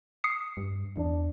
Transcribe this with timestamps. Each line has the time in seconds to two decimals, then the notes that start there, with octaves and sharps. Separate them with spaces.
0.24 D#6 C7 C#7
0.57 G2
0.97 E2 D4